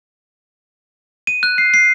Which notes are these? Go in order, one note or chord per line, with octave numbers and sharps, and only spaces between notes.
D#7
F#6
C7
C7